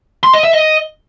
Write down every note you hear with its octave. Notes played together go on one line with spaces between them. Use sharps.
C6
D#5
E5
D#5